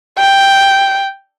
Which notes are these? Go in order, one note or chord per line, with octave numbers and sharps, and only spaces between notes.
G5